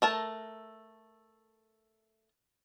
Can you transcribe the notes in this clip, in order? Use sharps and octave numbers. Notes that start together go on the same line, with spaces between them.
A3 A#4 A5